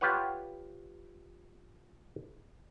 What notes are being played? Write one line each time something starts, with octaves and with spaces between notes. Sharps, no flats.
F4 G4 B4 C#5 F#5